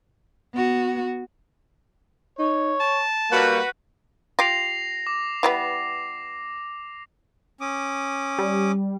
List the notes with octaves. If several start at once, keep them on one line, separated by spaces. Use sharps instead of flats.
B3 F#4
D#4 C#5
A5
G3 A#3 F#4 B4
F4 G4 A#6 C7 F7
D6
E3 G3 B3
C#4 D6 D#6
G3